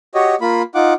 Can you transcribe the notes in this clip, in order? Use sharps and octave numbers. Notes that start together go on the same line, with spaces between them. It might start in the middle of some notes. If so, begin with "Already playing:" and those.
F#4 G4 C#5 D#5
A#3 F4 B5
D#4 F4 F#5 D6